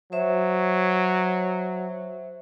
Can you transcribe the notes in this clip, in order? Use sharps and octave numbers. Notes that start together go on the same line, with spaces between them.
F#3 C5 E5